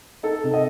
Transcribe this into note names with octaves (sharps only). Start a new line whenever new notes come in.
D#4 A4
C3
D#5